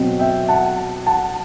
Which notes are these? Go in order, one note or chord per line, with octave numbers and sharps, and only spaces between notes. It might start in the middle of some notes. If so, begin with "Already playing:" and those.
Already playing: B2 F#3 C4
E5 G5
F#5 A5
F#5 A5